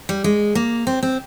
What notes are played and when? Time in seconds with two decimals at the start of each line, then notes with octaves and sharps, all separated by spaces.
0.09 G3
0.24 G#3
0.55 A#3
0.87 C4
1.03 C4